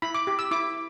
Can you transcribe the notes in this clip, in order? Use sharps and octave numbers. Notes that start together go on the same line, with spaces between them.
E4 B5
D6
G4
E6
E4 D6